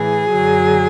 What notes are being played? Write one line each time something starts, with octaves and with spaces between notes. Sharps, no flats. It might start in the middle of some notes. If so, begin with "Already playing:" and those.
Already playing: A2 E3 G#4
F#2 D3 F#3